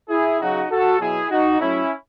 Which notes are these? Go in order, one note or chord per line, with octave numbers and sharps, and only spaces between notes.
E4 G#4
C#3 F#3 D#4 F#4
F#4 A4
B2 F#3 E4 G#4
D#4 F#4
A2 F#3 C#4 E4